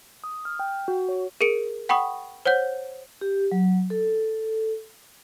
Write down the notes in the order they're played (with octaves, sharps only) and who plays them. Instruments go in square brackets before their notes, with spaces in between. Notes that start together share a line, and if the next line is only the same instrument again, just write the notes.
[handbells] D#6
F6
G5
F#4
C#5
[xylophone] G#4 A#4 C#7 D7
F#5 G5 B5 C#6 D#6
C5 C#5 F#5 G6
[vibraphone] G4
F#3
A4